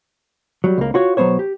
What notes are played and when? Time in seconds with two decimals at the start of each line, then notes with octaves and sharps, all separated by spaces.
0.64 F#3 G3
0.78 C#2 A#3
0.94 F4 F#4 C#5
1.17 B1 F#3 A3 B3 C5 C#5
1.39 G4